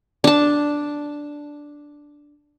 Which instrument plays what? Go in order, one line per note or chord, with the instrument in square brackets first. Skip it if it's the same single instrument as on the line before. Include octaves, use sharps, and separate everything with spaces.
[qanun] D4 A5